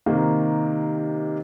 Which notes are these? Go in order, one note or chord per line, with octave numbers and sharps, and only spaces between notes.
C3 D#3 A#3